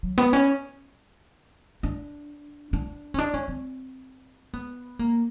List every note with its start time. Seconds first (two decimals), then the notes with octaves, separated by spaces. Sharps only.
0.03 F#3
0.18 B3
0.33 C#4
1.83 D4
2.73 D4
3.14 C#4
3.19 D4
3.34 C#4
3.48 C4
4.54 B3
4.99 A#3